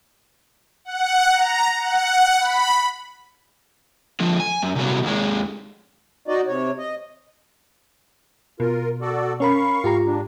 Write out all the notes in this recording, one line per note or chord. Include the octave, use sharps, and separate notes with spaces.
F#5
A#5
F#5
B5
D3 F3
G#5
F#2
C2 F#3
D#2 G#3
D#4 F#4 D5 D#5
C3 C#5
D#5
B2 F4 A#4
F#4 A4 D5
C#4 A#4 F5 B5 C#6
G#2 F4 G4 A#5
G#3 D4